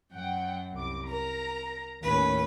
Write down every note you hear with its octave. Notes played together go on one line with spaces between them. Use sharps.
F#2 F#5 G5
C2 D6
A#4 A#5
D#2 A2 C#4 B4